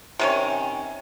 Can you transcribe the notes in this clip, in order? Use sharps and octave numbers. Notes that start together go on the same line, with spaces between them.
C3 D#3 C#4